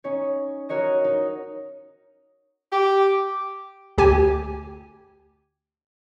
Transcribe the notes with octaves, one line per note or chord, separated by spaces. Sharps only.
C#4 D#4 C#5
F#4 A#4 C#5 D#5
D#4
G4 D6
D2 G4 G#5